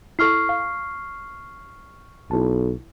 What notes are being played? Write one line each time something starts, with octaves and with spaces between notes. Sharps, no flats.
E4 A4 C#6 F6 C7
F5
B1 E4 A5